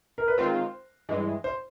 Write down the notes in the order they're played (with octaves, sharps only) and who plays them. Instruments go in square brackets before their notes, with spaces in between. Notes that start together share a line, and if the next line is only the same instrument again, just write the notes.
[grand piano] A#4
B4
[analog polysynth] D#3 G#3 C4 F4 [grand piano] C5
[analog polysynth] G2 E3 G#3
[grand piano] C5